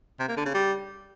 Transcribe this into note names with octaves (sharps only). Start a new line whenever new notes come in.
C3
A#3
D3
C#3
G3